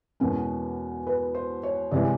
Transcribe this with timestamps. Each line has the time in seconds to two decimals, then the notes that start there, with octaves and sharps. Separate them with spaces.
0.20 E2 B2 G#3 C#4 A#4
1.07 B4
1.35 C5
1.63 C#5
1.91 C2 C3 E3 G#3 D5